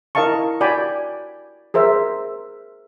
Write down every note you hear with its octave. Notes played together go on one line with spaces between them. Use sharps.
E4 A#4 D#5 F5 A5 C#6
F#4 D5 G5 G#5 B5
G#4 A#4 C5 E5